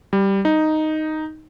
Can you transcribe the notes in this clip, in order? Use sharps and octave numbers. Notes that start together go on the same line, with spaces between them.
G3
D#4